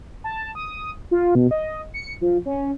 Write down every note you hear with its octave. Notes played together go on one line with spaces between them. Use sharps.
A5
D#6
F4
B2
D#5
C#7
F3
C#4